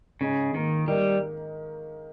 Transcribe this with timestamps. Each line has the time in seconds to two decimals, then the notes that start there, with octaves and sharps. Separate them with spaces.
0.21 G#2 C#3
0.54 D#3 A#3
0.88 D#3 G3